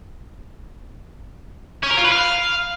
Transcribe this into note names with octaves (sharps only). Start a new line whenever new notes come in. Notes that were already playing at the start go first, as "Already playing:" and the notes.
C#4
A#4
F4
B4
F5